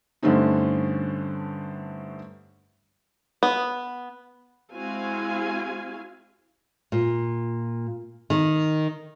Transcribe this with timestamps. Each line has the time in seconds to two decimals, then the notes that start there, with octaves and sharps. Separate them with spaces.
0.23 G2 D3 A3 C4 C#4 D#4
3.43 B3
4.74 G#3 C4 E4 F#4 F5 G#5
6.92 A#2
8.30 D#3